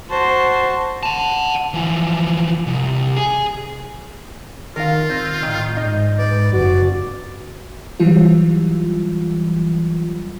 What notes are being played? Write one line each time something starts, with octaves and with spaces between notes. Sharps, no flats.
F#4 C5 A5
F#5 A5
E3 F3
C2
G#4
D#3 F4 A#4 F5
C4 G6
A2 D#3
G#2 D#4
G#2 B4 D5
F#1 F#2 F#4 D5
E3 F#3 G3 F4